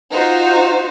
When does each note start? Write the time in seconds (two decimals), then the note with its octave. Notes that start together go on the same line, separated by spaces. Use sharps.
0.13 D#4 F4 F#4 C5